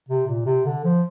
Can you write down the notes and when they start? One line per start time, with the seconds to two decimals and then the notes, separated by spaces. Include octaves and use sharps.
0.09 C3
0.28 A#2
0.46 C3
0.65 D3
0.84 F3